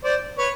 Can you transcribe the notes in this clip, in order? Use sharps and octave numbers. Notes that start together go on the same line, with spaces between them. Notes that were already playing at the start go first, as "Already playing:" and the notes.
C5 D5
B4 C#5